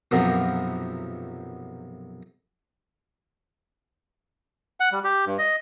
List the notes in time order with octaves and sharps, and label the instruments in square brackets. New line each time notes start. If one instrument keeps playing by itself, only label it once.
[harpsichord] B1 F#2 C3 F3 B3 A#4
[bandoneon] F#5
G3
G4
G2
D#5